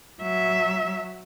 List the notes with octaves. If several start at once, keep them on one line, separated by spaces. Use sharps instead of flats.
F#3 E5